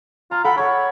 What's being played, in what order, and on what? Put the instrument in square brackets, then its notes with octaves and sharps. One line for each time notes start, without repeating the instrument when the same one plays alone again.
[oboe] F4 [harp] A#5
[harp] A4 F#5 G5 [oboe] B5
[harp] A4 B5 [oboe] C#5